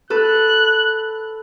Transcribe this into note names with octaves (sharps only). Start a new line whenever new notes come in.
A4 B4 F#6